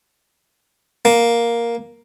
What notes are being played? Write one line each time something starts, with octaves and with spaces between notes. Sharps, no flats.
A#3